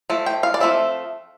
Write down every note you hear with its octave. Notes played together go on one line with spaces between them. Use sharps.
F3 A3
G5
F5
D5
F3 A3 C4 E5